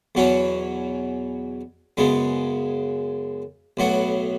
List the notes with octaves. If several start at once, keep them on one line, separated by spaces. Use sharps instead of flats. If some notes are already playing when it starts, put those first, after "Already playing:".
E2 B2 F#3 C#4 F#4
F#2 C#3 G#3 B3
B1 A2 F#3 B3 F#4